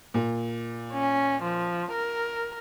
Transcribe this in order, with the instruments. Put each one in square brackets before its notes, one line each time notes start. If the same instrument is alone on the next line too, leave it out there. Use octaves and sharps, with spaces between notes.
[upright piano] A#2
[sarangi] C#4
F3
A#4